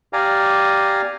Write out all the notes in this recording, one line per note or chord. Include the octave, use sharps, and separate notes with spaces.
G4 D5 F5 G#5 A#5